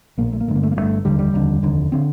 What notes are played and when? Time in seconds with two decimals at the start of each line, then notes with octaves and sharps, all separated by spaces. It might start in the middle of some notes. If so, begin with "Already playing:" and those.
0.18 A#1 A#2 A#3
0.33 A3
0.41 A#3
0.47 G1 G2 D3 A3
0.56 A#3
0.63 A3
0.71 A#3
0.76 G1 G2 D3 A3
1.05 F1 D#2 D3 G3
1.19 G3
1.34 F1 D#2 D3
1.62 F1 D#2 D3
1.92 D3 C4